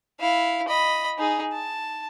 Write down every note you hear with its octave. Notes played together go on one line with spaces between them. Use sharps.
E4 F5
D#5 B5
D#4 G#4
A5